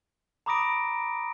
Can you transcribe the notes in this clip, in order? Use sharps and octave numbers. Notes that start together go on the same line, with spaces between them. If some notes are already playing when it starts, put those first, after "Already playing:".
A#5 B5 D6 D#6 A#6 D7